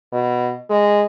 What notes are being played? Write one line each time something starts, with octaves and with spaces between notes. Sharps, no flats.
B2
G#3